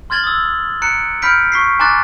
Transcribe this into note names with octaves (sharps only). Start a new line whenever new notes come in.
C6 F6 G#6 A6 F#7 G7
D#6 E6
A#5 F#6 C#7 D7
B5 F6 G6 B6 D7
C#6 B6 C7
G#5 A#5 C6 D6 F#6 A6